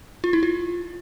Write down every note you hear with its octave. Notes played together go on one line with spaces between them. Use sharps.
F4
E4
F4